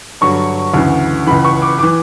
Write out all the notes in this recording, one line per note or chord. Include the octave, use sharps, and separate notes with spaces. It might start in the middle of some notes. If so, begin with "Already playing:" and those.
G2 D3 F#3 C#6
D2 C#3 E3
C#2 C#3 E3 B5
C#6
D6
E3 D6